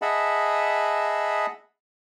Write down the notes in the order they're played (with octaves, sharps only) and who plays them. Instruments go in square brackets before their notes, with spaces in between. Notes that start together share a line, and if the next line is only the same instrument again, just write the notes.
[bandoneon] G#4 D#5 E5 F#5 A5 B5